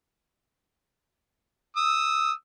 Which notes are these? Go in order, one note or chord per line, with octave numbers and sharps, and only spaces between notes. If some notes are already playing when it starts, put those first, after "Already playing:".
D#6 E6